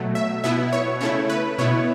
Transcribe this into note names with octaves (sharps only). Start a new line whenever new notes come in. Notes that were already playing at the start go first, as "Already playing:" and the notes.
Already playing: B2 F#3 A3
E5
B2 B3 E4 E5
C#5
C#3 A3 E4 C#5
B4
B2 B3 E4 C#5